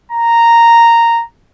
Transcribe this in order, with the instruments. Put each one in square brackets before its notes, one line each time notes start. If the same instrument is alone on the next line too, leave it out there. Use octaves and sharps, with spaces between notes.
[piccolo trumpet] A#5